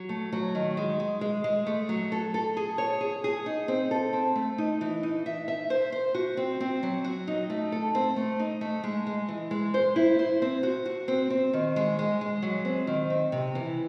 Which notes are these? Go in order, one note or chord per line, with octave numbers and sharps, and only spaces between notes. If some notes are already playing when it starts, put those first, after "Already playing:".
Already playing: F#3
A3
F#3
D#3
G#3
G#3
G#3
G#3
A3
F#3
A4
A4
G#4
C#5
G#4
G#4
D#4
C4
A4
C4
A3
D#4
E3
D#4
E5
E5
C5
C5
F#4
C4
C4
F#3
F#4
D#4
A3
A4
C4
A3
D#4
A3
G#3
G#3
E3
G#3
C5
E4
C5
C4
F#4
F#4
C4
C4
D#3
G#3
G#3
G#3
F#3
C4
D#3
C4
C3
E3